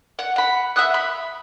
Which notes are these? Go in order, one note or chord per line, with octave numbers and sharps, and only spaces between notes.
F#5
F#5 B5
E5 F#5 D#6 F#6
B5